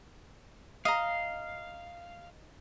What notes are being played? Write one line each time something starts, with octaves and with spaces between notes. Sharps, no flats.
D#5 F5 A#5